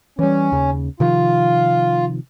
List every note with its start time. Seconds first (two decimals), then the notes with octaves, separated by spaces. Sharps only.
0.19 E3 G3 C#4
0.52 D#2 C#3
1.00 C3 D#3 F3 F4